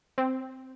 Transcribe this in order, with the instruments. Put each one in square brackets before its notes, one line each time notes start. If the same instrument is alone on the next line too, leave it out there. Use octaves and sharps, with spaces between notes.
[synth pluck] C4